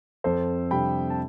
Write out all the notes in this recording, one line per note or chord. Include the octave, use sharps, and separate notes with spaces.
F2 A4 C5
C3 G3 D4 G5 B5
A5